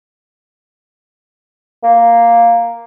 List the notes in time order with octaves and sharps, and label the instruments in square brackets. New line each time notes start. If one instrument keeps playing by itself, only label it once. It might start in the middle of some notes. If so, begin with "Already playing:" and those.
[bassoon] A#3